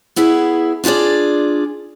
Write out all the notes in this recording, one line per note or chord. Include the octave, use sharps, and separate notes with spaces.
B3 E4 G#4 E5
D4 F4 F#4 G#4 D5